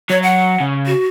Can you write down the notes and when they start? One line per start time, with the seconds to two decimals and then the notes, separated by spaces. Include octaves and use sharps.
0.10 F#3 C#5
0.23 F#5
0.60 C#3
0.86 F#4